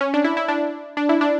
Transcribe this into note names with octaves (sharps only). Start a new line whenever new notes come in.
C#4
D4
E4
E4
D4
D4
E4
D4